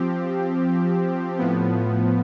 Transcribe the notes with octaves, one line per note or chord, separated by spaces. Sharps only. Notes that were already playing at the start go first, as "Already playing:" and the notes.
Already playing: F3 C4 G4
A2 F3 B3